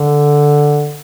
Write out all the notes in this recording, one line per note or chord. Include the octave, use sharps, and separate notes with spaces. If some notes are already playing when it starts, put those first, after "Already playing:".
Already playing: D3